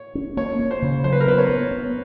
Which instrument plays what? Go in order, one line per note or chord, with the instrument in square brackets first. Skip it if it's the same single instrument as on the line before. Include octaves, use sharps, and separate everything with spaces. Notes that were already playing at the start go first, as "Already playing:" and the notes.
Already playing: [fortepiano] C#5
[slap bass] C#4
[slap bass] A#3 [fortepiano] C#5
[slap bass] A#3
[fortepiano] C5
[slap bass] C#3
[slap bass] F#3 [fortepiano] C5
[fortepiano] B4
A#4
[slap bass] B3 [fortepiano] B4
[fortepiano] C#5
[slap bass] B3
B3